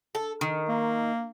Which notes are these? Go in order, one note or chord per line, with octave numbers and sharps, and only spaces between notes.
A4
D#3
A#3